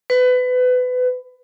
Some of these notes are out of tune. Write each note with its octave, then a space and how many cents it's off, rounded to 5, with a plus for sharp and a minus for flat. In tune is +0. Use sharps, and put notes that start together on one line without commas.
B4 +25